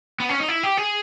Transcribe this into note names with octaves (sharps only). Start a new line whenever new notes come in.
B3
C#4
D#4
E4
G4
G#4